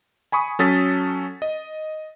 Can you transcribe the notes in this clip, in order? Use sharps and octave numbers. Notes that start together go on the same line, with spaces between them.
G#5 B5 C#6 D#6
F#3 C#4 A4 D#6 A6 B6
D#5